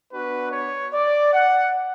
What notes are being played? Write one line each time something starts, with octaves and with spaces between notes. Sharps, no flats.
B3 D4 F#4 B4
C#5
D5
F#5